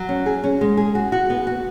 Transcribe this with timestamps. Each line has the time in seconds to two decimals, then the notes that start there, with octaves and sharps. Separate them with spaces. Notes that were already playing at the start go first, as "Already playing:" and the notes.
Already playing: F#3
0.09 C#4
0.26 G#4
0.44 C#4
0.61 G#3
0.77 G#4
0.95 F#4
1.12 F#4
1.30 B3
1.47 F#4